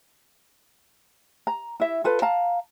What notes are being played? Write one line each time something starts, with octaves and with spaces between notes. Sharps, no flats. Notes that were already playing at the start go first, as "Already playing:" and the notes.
A#5
E4 E5
F4 A4 B4
F5 A5 A#5